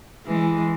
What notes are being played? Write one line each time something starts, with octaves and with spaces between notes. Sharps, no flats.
E3 G#3